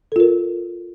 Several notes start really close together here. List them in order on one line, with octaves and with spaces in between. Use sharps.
A4 F4 A#4